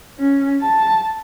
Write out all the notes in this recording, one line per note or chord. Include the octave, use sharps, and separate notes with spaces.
C#4
A5